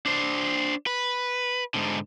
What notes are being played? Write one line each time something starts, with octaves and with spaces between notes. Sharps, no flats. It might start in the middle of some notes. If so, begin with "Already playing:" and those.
D4 C5
B4
G#2 D3